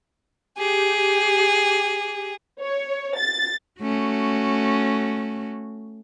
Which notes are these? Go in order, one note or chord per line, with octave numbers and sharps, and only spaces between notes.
G4 G#4
C#5
A6
A3 C#4 F#4